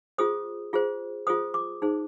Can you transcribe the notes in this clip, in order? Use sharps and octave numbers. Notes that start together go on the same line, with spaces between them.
F4 G#4 C5 D#6
F4 G#4 C5
F4 G#4 C5 D#6
D6
D#4 G#4 C5